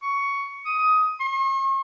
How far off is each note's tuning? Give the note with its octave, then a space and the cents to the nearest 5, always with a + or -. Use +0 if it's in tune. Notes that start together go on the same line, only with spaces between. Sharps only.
C#6 +10
D#6 +15
C#6 -45